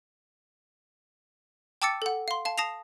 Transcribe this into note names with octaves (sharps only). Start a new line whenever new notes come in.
G5 A5 D6 E6 A6 C#7
A4 F#5
F5 C6
F5 A5
A5 D#6 A#6 C7 F7